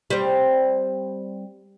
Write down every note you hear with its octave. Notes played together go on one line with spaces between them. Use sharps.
G3 C4